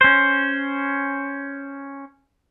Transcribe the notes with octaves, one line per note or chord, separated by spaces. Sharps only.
C#4 C5